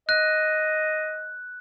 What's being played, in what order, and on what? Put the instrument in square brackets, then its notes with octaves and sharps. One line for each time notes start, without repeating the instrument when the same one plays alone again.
[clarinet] D#5 [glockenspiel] F#6